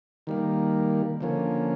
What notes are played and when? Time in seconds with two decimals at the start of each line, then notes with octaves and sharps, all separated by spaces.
0.27 D#3 G3 A#3
1.21 D3 F3 A#3 C#4